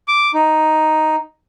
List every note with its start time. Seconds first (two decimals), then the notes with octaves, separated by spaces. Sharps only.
0.08 D6
0.34 D#4